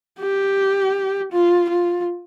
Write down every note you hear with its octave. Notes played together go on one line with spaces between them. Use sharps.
G4
F4
F4